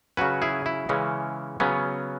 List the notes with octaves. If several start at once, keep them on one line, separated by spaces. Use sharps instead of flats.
C#3 F#3 C#4 F#4 B4
E4 G#4
E4
C#3 E3 G#3 C#4
C#3 F#3 B3 C#4